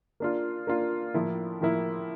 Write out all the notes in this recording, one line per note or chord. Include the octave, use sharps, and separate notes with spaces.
A#3 D4 F4
A#3 D4 F4
A2 F3 A#3 E4
A2 F3 A#3 E4